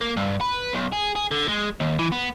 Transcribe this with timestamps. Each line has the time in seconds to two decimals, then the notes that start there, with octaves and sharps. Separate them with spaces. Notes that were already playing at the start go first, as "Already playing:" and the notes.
0.01 A#3
0.17 G2
0.41 B4
0.74 B1
0.93 G#4
1.16 G#4
1.31 D3
1.48 G#3
1.80 D#2
1.99 E3
2.12 B3